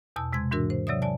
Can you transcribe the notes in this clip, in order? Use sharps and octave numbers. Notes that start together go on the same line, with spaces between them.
E2 B2 A5 E6
C3 G#3 C6 G#6
G#2 E3 D4 F#4 A#4 E6
C5
C3 F#3 C#5 D5 E5 D#6
D5 G#5 A5